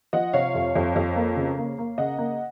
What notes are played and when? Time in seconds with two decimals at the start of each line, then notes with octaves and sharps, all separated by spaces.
0.13 F3 D#5 F#5
0.33 C3 C#5 F5
0.55 F2
0.75 F2
0.96 F2
1.16 A#3
1.36 C#3
1.58 A#3
1.78 A#3
1.98 C#3 D#5 F#5
2.18 A#3